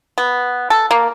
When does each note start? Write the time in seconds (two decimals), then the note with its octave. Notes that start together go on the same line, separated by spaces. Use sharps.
0.18 B3
0.70 A4
0.91 A#3